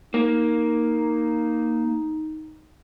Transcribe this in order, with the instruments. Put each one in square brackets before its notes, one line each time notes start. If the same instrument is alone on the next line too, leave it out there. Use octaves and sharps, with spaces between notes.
[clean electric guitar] A#3 [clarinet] D#4